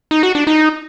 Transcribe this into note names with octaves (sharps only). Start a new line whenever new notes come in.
D#4
F#4
D4
D#4